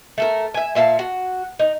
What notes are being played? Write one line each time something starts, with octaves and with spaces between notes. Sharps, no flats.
A3 A4 A#4
E5 G#5
A#2 E5 F5 A5
F#4
D#4